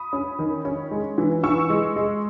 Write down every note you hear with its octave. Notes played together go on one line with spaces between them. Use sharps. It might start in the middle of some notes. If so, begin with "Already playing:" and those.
Already playing: B5 D#6
C#4
D#3
C#4
G#3
E3
E3 C#6 E6
G#3
G#3